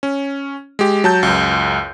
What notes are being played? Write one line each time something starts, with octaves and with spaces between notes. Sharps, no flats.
C#4
G#3 G4
F#3 A5 G6
C#2 F#2